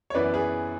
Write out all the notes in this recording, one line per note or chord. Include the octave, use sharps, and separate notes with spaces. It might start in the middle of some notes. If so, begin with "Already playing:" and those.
C#5
F#2 E3 B3 B4 D5
G#4 B4